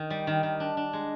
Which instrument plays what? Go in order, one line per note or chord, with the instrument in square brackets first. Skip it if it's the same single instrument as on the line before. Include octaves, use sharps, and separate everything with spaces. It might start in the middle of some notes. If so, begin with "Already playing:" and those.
Already playing: [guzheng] D#3
G3
D#3
D#3
D4
D4
G#3